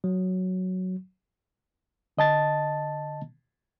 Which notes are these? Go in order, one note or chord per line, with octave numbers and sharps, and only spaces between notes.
F#3
D3 D#5 A5 A6